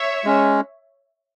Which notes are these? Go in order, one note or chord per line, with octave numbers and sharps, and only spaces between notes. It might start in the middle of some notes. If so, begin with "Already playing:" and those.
Already playing: C#5 E5
G#3 C#4